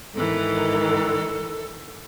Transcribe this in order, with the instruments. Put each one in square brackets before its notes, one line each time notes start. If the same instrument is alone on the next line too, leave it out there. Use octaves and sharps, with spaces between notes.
[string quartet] G#2 D#3 E3 [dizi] A4